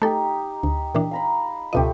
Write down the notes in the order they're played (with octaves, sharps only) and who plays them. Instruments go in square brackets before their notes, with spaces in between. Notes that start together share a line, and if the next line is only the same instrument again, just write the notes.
[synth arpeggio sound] A3 A4 [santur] D#4 G4
[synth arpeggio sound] D2
A#2 E3 D4
[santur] F5 A#5 B5
[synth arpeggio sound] C#2 B2 D#5 [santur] F3 A3 G4